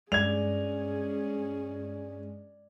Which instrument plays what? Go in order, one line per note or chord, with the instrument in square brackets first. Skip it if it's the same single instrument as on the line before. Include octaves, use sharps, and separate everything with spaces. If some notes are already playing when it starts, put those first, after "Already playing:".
[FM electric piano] G2 G#3 [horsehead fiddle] C#4 G#4 [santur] D5 [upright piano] G#6 F7